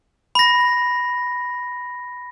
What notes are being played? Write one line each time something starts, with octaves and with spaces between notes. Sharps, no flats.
B5 A#6